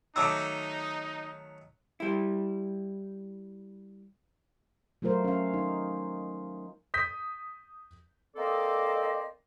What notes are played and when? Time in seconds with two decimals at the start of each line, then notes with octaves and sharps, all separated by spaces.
0.16 D#3 F#3 A3 D#4 A5 D6 E6
2.00 G3 E4
5.02 F#3 A3 F4 A#4 C5
5.24 C#4 F5
5.54 D#4
6.94 D#6 G6 B6
8.36 A#3 C4 A4 C5 D5 D#5